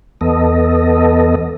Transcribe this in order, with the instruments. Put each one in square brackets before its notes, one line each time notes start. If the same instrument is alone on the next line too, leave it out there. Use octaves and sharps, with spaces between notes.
[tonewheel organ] E2 B3 A4 D#5